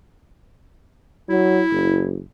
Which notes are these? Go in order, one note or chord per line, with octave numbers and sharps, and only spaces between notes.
F#3 E4
F#1